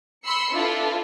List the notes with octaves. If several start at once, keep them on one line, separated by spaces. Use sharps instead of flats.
B5 C6 E6 C7 C#7
D4 E4 F4 A4 B4